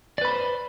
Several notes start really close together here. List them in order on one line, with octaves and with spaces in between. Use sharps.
D5 B4 B5 C5